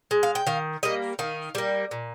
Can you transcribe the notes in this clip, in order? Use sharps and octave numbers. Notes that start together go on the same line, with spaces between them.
G#3
F5
G5
D#3 F5
G3 A#3 D#5
D#3 F5
G3 A#3
A#2